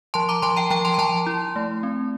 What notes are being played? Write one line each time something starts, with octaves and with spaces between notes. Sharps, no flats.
F3 A5 C6
A#5 D6
F3 A5 C6
G5 A#5
F3 G5 A#5
A5 C6
A#5
F3 A5 C6
E4
A3
C4